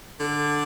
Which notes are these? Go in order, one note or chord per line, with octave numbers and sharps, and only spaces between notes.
D3